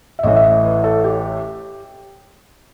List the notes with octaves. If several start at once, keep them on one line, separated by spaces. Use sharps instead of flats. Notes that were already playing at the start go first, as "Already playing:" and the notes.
E5
A1 A2 E3 D#5
E5
D#5
B4
A4
G4